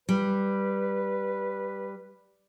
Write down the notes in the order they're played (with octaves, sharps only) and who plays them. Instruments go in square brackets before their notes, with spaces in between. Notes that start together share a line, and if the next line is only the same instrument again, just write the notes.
[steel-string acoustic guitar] G3 [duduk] B4